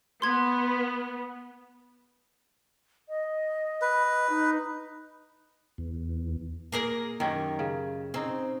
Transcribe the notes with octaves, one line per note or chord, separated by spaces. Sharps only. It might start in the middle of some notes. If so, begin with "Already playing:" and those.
B3 C6 G#6
D#5
B4
D#4
E2
A#3 G#4 A#4
F#2 D#3 C#4 G4
C#3
C4 C#4 D#4 C5